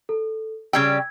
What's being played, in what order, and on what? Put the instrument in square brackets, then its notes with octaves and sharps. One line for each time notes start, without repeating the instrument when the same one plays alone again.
[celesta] A4
[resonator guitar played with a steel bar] C#3 G3 G5 [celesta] E6 G#6